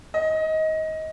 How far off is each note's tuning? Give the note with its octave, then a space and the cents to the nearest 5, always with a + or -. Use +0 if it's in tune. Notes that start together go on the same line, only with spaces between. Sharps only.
D#5 +20